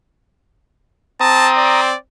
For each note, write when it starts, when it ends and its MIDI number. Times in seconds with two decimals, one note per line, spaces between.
1.21 1.93 60
1.21 1.51 81
1.21 1.81 82
1.21 1.81 87
1.57 1.97 74